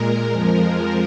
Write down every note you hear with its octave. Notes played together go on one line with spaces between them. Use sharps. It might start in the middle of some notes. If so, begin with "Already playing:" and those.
Already playing: A#2 G#3 A#4
F2 F3 G#3 A#4
A#4